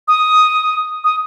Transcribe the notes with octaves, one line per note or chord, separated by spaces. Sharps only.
D#6
D#6